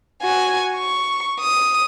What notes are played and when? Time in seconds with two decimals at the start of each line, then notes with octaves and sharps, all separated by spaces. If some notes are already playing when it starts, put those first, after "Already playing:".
0.22 F#4 G#5
0.76 C#6
1.41 D#6